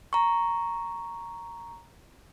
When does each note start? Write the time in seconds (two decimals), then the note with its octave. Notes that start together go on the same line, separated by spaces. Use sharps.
0.13 A#5 C#6